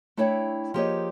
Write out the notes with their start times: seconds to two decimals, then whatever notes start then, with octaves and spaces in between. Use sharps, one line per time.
0.17 A3 D4 E4 C#5 E5 G5
0.74 F3 A#3 G4 G#4 C#5 D#5